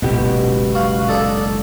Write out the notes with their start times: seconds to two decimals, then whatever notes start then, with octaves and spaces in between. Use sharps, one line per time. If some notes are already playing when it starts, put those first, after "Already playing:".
0.02 F#1 C#2 B2 G4
0.75 F#4 F5
1.08 D#4 A4 D5